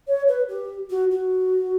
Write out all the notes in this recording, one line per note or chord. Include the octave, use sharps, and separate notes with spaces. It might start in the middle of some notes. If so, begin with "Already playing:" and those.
C#5
B4
G4
F#4
F#4